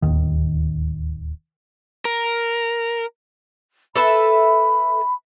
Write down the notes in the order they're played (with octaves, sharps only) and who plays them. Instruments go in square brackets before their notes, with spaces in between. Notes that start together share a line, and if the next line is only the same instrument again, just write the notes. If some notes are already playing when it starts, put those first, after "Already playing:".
[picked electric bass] D1 D#2 D#3
[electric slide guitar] A#4
[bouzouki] A4 B4 E5 [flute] B5